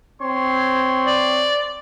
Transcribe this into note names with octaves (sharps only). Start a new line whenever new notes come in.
C4 C#5 C6
D5